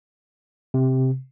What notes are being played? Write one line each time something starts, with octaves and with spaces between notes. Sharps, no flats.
C3